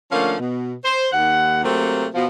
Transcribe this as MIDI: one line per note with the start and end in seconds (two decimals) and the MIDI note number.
0.11 0.36 50
0.11 0.36 53
0.11 0.36 57
0.11 0.36 58
0.11 0.36 61
0.11 0.36 77
0.39 0.73 47
0.85 1.07 72
1.12 1.62 39
1.12 1.62 78
1.64 2.06 48
1.64 2.06 54
1.64 2.06 57
1.64 2.06 58
1.64 2.06 60
2.14 2.27 47
2.14 2.27 53